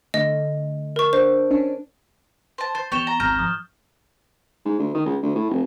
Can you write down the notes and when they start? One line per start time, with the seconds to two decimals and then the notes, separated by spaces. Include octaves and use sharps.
0.14 D3 A3 D#5
0.96 A#4 C#6
1.13 D4 C5
1.51 C#4 D4
2.58 C5 A5
2.75 C5 A6
2.92 E3 B3 G4 C#5 C#6 E7 G7
3.07 A#5
3.20 G#1 C#2 A#5 F6 G6
3.39 F3 D#6
4.65 G#2
4.79 D2
4.95 D#3
5.06 C#2
5.22 D2
5.35 A2
5.51 F1